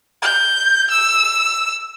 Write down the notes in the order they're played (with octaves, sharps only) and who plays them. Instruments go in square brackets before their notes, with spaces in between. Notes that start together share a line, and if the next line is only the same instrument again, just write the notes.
[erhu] G6
E6